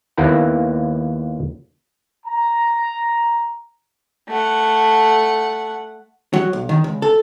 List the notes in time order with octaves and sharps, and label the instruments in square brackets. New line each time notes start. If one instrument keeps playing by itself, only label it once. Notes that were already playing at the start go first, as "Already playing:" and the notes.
[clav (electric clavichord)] D#2 A#3 B3 E4 F#5 A#5
[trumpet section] A#5
[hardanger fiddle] A3 F#5
[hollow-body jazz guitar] F#3
B1
D#3
C#2
A4